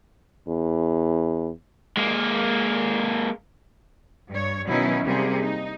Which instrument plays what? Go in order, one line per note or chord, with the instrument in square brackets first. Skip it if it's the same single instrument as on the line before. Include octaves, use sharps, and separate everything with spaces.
[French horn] E2
[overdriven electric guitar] G#3 A#3
[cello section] G2 C#5
B2 D#3 F#3 C#4 D#4 E4
C3 G3 A#3 G#4
D#4